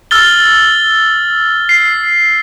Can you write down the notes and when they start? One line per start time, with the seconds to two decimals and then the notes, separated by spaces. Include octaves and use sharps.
0.11 E6 F6 A6 G7
1.69 C7